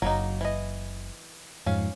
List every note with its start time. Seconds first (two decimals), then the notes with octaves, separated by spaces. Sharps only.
0.02 F#1 F#3 A#3 D#4
0.41 E3 D#5
1.66 F2 G#2 C#4 F5